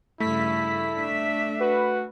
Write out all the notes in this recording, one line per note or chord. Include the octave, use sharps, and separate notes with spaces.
G2 C#3 A3 E4 B6
D4 E5
F#4 B4